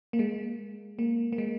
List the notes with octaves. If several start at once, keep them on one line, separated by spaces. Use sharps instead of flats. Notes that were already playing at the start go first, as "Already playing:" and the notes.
A#3
G#3
A#3
A#3
G#3